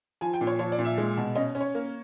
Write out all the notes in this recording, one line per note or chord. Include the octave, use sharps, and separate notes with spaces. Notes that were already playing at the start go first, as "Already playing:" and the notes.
F3 G#5
G5
A#2
C#5
F3 C#5
D5
A#2
E5
G#3
B2
C#4 D#5
C#4
C#5
A#3